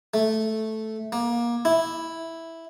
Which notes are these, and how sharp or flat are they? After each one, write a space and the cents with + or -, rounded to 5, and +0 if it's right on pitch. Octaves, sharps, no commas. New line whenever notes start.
A3 -5
A#3 +25
E4 -5